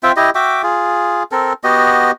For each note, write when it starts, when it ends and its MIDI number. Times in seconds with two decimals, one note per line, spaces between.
0.03 0.12 60
0.03 0.12 65
0.03 0.12 76
0.03 0.12 79
0.16 0.30 64
0.16 0.30 67
0.16 0.30 75
0.35 0.62 66
0.35 0.62 76
0.35 0.62 79
0.35 0.62 86
0.63 1.23 65
0.63 1.23 68
1.32 1.53 60
1.32 1.53 69
1.32 1.53 70
1.64 2.11 59
1.64 2.11 66
1.64 2.11 67
1.64 2.11 75